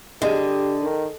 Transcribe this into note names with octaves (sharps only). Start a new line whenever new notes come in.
D3 G4 G#4 D#5
D#3